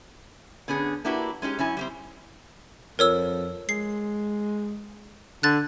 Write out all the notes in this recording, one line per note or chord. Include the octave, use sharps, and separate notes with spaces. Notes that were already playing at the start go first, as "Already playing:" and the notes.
D3 B3 C#4 G#4
A#3 D4 E4 F#4 G4 B4
G#3 C#4 D#4 G4
F#2 C#4 E4 G#5
G3 A#3 C4
F2 A#4 C#5 E6
G#3 C7
D3 F#6 A6